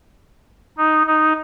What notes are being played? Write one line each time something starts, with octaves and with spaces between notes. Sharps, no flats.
D#4
D#4